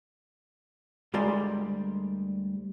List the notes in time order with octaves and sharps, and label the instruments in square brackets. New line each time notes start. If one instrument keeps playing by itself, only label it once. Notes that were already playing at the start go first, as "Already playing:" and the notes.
[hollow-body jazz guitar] D2 G3 G#3 A#4 D5 C6